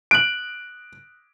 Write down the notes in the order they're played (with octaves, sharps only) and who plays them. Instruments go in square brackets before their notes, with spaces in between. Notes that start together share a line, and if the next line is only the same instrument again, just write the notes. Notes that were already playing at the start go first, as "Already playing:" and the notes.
[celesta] F#6 F#7 [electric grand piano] D7